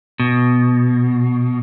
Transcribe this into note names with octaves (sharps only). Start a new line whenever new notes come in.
B2